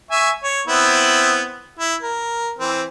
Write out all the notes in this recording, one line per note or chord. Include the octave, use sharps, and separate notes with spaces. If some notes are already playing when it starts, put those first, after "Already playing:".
E5 G#5 C#6
C#5
B3 C4 E4
E4
A#4
E3 C4